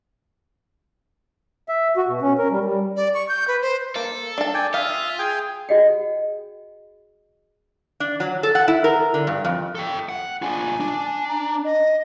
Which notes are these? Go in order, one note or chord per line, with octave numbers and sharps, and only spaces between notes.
E5
F#4
B2
C#4
A#4
G3
G3
D5
C#6
G6
B4
C5
A#3 A4
D4 A5
D5 G5 G#5
F4 E5 F5 D#6
G#4 G5 G#5
F#4 G#4 D#5 F#5 G5
D4
F#3
A4
F#5
E4
A#4
D3
G2
F2
A4 G5
F#5
D4 F4 G#5
D4
A#5
D#5